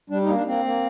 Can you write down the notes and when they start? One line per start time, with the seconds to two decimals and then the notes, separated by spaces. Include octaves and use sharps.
0.10 G3 D4
0.22 D#4
0.27 A#3
0.35 D4
0.46 A#3 C4
0.65 A#3